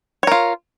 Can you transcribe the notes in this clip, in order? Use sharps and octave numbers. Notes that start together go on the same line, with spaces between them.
F4 A#4 C#5